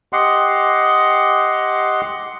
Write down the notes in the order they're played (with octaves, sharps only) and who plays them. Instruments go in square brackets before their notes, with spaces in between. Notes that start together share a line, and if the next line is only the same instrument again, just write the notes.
[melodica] G4 D#5 F#5 C6